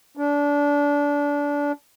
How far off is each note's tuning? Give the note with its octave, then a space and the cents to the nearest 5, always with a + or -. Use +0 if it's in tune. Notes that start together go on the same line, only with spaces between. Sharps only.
D4 -25